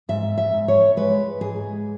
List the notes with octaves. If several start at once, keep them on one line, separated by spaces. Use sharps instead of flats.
G#2 E5
E5
G#2
C#5
G#3 B4
G#2 G#4